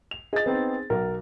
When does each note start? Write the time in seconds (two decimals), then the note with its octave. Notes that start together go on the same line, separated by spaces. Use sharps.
0.11 F7
0.33 G#4 D#5 A6
0.46 B3 C4 D#4
0.90 B1 A#4